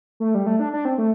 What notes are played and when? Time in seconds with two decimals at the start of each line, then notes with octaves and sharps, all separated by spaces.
0.20 A3
0.35 G3
0.46 A3
0.59 D4
0.73 D4
0.85 C4
0.98 A3